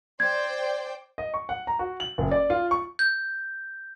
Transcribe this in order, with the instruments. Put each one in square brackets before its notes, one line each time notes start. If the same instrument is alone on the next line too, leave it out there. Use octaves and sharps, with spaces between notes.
[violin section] C5 D5 G5 [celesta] G#6
[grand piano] D#5
C#6
F#5
A#5
F#4
F#7
F#1
D5
F4
C#6
[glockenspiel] G6